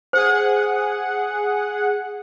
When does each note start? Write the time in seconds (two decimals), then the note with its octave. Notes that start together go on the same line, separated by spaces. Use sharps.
0.13 G#4 C5 F#5